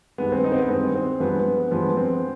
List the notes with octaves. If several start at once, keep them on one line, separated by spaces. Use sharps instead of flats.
G2 D#3 G#3 B3
C4
D#4
C4
B3
G2 D#3 G#3 C4
C4
G2 F3 G#3 B3
G2 F3 G#3 B3
C4